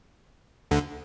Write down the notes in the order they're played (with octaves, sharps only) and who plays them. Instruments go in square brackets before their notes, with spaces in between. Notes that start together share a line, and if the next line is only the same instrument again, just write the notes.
[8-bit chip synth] D2 D3